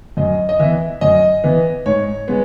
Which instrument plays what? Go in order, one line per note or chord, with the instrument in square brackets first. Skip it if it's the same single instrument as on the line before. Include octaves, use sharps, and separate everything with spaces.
[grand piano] F#2 D#5
D#5
E3 B3 E5
F#2 D#5
E3 B3
G#2 C#5
G#3 B3